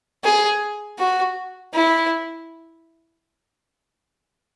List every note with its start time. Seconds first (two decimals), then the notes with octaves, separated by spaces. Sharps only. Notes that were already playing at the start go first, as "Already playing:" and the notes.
0.24 G#4
0.98 F#4
1.74 E4